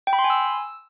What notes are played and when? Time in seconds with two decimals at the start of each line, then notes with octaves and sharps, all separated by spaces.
0.07 G5
0.13 B5
0.19 C6
0.24 G#5
0.30 E6